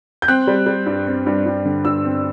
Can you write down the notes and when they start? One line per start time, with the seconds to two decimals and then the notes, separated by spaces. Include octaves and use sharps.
0.22 G6
0.28 C4 F#6
0.47 G3
0.66 G3
0.86 G2
1.07 C4
1.26 G2
1.46 G2
1.65 D3
1.85 G2 E6
2.05 C4